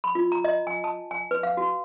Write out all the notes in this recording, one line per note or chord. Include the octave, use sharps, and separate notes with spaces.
B5
F4
A#5
D#5
G#5
A5
G#5
B4
F5
F#4